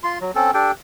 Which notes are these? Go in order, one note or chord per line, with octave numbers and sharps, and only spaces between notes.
F4 C6
F#3
C4 C#4 A4
D4 G4 A4 G5